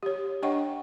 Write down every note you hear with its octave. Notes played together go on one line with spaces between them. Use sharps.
G4 C#5
D4 C#5 D#5 F#5 G5 C#6